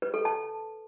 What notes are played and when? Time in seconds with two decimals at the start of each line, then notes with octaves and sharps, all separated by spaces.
0.02 B4
0.14 A4
0.25 A5